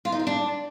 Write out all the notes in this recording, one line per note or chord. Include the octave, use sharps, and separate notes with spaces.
F4
D#4
C4
D4